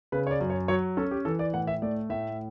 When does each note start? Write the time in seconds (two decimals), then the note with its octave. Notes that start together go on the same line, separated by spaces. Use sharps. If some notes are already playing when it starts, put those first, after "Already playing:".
0.12 C#3 B4
0.27 C#5
0.31 D5
0.41 F#2
0.50 C#5
0.68 F#3 C#5
0.97 C#4 A4
1.11 G4
1.25 E3 A4
1.39 D5
1.53 A2 F#5
1.67 E5
1.82 A3 D5
2.10 A2 E5